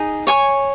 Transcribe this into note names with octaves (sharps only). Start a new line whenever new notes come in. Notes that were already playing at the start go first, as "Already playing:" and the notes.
Already playing: D#4 G#4
C#5 G#5 C#6